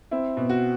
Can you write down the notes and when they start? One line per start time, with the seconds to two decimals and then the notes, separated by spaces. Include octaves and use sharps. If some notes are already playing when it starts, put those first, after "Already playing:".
0.11 C4 E4
0.37 B2
0.49 F#4